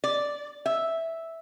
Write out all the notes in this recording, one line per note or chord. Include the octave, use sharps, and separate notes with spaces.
D5
E5